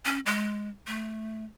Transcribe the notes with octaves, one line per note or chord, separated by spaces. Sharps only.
C#4
G#3
A3